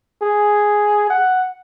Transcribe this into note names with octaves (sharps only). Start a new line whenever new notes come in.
G#4
F#5